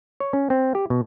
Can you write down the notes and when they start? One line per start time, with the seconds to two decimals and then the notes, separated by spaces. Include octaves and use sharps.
0.20 C#5
0.33 C#4
0.50 C4
0.75 G4
0.90 B2